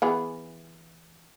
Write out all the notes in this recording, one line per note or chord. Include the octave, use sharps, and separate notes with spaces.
E3 B3 G#4